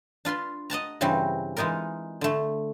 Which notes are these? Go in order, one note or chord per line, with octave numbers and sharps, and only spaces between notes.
D4 F4 B4 C6
D#5 F#5 A5 A#5
G2 C#3 E3 G3 C4 F#4
E3 G#3 D#4 F4 A#4
D3 A3